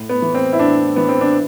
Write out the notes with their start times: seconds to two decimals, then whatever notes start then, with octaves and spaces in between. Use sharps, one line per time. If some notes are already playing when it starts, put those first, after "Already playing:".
Already playing: A2
0.09 B3
0.22 E3
0.35 C4
0.53 E4
0.59 A2 D4
0.96 E3 B3
1.09 C4
1.21 D4